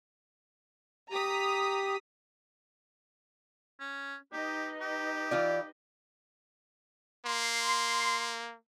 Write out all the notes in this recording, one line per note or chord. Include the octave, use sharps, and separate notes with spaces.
G4 A#5 D#6 B6
C#4
D#4 G4 B4 D#5
G4
E3 F4 D5
A#3 C6